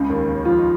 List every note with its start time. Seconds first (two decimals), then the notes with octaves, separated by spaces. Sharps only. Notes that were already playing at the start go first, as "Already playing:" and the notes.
Already playing: C#2 C#3
0.09 D#2 D#3
0.27 C#3 C#4
0.45 F3 F4
0.58 D#4